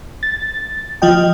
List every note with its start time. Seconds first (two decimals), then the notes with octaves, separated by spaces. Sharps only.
0.23 A6
1.02 F3 F4 D#5 G5